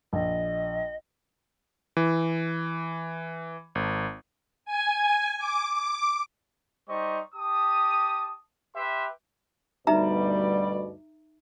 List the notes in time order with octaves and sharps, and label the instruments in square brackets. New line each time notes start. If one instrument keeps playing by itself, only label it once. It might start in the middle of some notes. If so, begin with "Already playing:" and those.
[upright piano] A#1 [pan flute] D#5
[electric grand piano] E3
G#1
[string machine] G#5
D6
D6
[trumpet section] G3 D#4 C5 D#5 C#6
G4 A5 D#6
G4 B4 E5 C6
[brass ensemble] D2 B2 D5 [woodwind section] G2 G3 [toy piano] D#4 E5 A#5